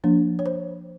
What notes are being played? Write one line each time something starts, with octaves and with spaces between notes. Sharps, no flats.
F3 A#3 D4
C#5
C5